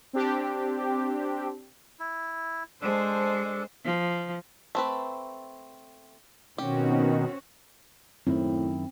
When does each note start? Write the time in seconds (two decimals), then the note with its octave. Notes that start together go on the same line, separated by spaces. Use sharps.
0.13 C4 D4 G4
2.00 E4
2.82 G#3 D4 A4 C5
3.85 F3
4.75 A3 C4 B4
6.58 B2 D#3 C4 C#4 F#4 G4
8.27 F#2 A2 D#3 C4 E4